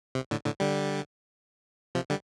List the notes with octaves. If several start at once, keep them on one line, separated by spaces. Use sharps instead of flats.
C3
A2 D3
A2 D3
D3 G3
C3 F3
D3 G3